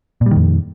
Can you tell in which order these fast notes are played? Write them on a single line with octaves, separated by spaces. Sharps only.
A#2 G3 D#3 F2